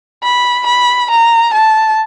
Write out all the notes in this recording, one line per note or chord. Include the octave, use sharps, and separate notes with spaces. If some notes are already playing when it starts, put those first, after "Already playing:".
B5
B5
A#5
A5